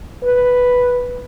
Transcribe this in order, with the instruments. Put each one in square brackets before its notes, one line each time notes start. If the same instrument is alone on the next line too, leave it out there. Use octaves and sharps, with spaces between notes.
[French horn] B4